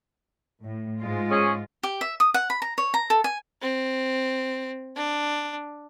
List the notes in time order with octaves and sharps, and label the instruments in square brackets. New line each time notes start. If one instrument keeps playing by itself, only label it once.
[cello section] A2
G#2 G#3 F4
[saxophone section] C#4 G#4
[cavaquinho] G4
E5
D#6
F#5
B5
A#5
C#5
A#5
A4
G#5
[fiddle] C4
D4